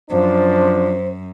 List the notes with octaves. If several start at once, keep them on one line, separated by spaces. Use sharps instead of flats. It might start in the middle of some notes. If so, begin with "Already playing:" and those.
F#2 F3 D4 C5